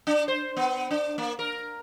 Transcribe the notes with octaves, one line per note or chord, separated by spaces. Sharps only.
D4
C5
B3
D4
A#3
A#4